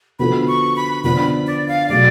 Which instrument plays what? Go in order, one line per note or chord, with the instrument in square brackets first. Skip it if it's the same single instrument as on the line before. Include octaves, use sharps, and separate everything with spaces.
[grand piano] D3 F3 B3 F#4 A4 [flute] B5
[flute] C#6
B5
[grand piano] D3 F3 B3 D4 [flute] B5
[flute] D5
F5
[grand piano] B2 F#3 A3 D4 G#4 [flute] D5